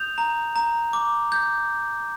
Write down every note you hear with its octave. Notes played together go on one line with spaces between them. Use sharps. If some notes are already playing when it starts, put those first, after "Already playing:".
Already playing: D#6 G6 F7
A#5
A#5
D6
G6